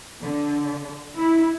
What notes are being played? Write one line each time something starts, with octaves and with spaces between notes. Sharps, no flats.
D3
E4